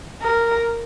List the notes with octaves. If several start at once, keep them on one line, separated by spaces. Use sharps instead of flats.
A#4